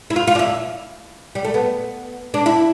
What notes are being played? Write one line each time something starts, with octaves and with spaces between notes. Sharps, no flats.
E4
F4
F4
D4
E4
G3
A3
B3
D4
E4